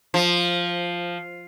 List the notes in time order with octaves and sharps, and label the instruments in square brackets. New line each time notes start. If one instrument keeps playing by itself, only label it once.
[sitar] F3